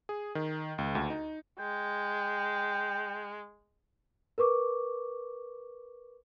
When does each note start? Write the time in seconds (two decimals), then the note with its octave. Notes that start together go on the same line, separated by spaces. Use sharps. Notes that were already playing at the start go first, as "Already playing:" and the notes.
0.09 G#4
0.35 D#3
0.78 C#2
0.95 D2
1.10 D#4
1.59 G#3 G5
4.38 A#4 B4 C#6 D6